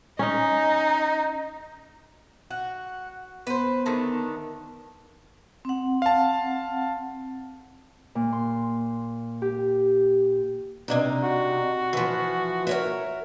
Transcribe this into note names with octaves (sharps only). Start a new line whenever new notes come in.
C#4 D#4 D#5
F#4 F#5
B3 B4 C5
D3 D#3 A3
C4 F#5
F5 A5
A#2
C6
G4
C3 D4 D#4
F#4
E3 F3
A#4 C#5 E5